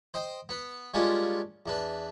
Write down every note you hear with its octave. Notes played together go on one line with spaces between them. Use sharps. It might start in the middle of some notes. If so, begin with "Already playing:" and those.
C5 D#5 G5
B3 B4
G3 G#3 A#3 C#4 D4 F4
E2 D4 B4